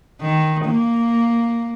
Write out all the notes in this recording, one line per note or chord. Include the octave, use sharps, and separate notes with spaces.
D#3
A#3